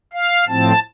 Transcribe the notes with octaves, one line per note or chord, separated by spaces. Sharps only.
F5
A2 F3 C4 A5